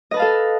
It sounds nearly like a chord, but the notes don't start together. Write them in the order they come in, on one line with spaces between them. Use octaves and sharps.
D#5 B4 A5 F5 A4